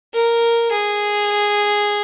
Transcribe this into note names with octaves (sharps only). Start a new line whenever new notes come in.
A#4
G#4